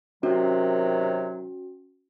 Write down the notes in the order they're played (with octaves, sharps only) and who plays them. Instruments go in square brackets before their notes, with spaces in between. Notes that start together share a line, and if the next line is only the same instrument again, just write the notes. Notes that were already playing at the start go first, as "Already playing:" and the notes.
[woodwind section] C3 D#3 F#3 [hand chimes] C#4 F#4